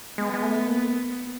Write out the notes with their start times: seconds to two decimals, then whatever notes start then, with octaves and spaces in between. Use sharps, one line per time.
0.18 G#3 B3
0.34 G#3
0.42 A3
0.67 A#3